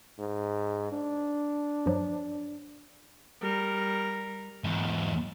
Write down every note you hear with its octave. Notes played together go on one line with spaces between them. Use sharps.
G#2
D4
G2 F3 F#3
G3 A#4
E2 G#2